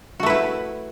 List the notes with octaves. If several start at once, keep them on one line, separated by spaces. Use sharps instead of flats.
A3 E4 F#4 B4